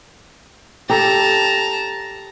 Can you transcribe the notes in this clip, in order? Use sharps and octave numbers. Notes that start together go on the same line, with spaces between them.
G4 A4 A5 A#5